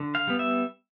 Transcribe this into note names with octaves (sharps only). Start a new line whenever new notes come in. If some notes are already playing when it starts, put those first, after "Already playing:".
Already playing: D3
F5
G3 B3
E5